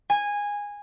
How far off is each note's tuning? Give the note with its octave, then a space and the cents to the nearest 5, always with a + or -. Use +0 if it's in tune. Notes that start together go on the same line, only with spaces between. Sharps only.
G#5 -15